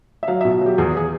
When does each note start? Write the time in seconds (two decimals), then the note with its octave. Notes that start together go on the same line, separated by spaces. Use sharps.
0.23 E5
0.28 F#3 F5
0.41 E5
0.45 B2
0.61 F#3 G4
0.78 E2 G#4
0.97 G#4